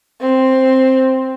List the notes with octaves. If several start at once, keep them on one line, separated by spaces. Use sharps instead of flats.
C4